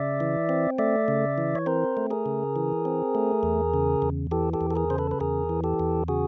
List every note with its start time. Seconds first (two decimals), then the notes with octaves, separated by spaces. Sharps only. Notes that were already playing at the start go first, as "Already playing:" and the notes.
Already playing: C#3 D5 E5
0.20 E3
0.49 C4
0.78 A3 D5 E5
1.08 C#3
1.38 E3
1.55 C#5
1.66 C4 A#4 C5
1.97 A3
2.11 G#4 A#4
2.26 C#3
2.56 E3
2.85 C4
3.15 A3
3.43 E2
3.74 C#3
4.02 E2
4.31 E3 G4 A4
4.53 G4 A4
4.61 E2
4.71 A4
4.76 G#4 A#4
4.90 C#3 C5
4.98 A4 B4
5.11 B4
5.20 E2 G#4 A#4
5.49 E3
5.64 G4 A4
5.80 E2
6.08 C#3 F#4 G#4